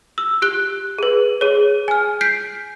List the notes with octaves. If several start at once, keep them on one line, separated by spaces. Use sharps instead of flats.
E6
G4 F#6 G7
G#4 B4
G#4 C#5
G#5 F6
G6 B6 C7 D7